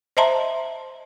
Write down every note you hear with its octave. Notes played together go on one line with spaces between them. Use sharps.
C5 D#5 E5 A5 A#5 C6